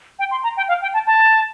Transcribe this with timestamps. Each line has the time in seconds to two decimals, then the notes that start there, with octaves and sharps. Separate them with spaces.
0.19 G5
0.31 C6
0.43 A#5
0.57 G5
0.68 F5
0.82 G5
0.94 A5
1.07 A5